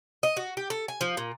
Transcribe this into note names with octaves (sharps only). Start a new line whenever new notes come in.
D#5
F#4
G4
A4
G#5
F3
A#2